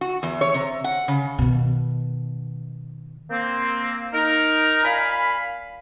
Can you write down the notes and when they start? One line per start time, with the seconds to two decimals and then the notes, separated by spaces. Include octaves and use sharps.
0.01 F#4
0.23 E2
0.41 C#5
0.54 C3
0.84 F#5
1.08 C#3
1.38 B2 D#3
3.30 A#3 C4
4.14 D#4 A#4
4.85 A#2 F5 G#5 B5